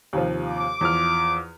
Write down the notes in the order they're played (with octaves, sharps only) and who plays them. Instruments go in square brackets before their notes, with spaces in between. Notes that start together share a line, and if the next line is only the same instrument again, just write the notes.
[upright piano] D#2 C3 F3
[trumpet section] D6
[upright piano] E2 F3 F6